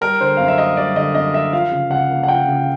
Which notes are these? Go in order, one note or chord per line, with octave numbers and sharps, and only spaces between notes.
G3 A#4
D3 C5
F#2 F5
E5
A#3 D#5
G3 D5
D3 D#5
F#2 D#5
A#3 E5
F3 F5
C#3
C#2 F#5
A#3
F#5
F3 G5
C#3